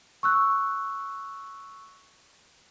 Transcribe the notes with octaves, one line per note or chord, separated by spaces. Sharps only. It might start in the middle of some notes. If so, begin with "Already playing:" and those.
C#6 E6 F#6